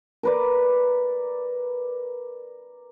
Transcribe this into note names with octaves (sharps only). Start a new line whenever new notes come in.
A#4 B4 D5